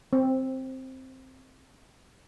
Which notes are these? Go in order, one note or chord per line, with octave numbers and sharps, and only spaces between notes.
C4